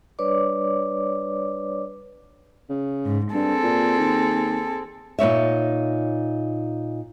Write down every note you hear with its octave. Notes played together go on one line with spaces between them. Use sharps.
G3 D4 B4 C#5 D5 D6
C#3
G#2
G2 C4 G#4 A4
A#2
D#2
A#2 D#4 C#5 E5